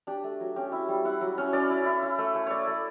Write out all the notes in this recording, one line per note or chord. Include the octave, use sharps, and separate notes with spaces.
D4 G4
A3
F#3
C#4 G4
E4
G3
E4 F#5
F#3
C#4
C#4 D5
E4
E4
E4
A3
A3
A3 C#5 D5
A3